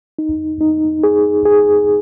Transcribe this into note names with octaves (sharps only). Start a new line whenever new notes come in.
D#4
D#4
G#4
G#4